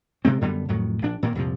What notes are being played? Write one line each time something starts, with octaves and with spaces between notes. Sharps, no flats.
C3 G#3 C4
F#2 D3 G3 B3
F2 A2 D#3 F#3
A#1 D4
A#2 D#3 A#3
C2 F2 A#2 F3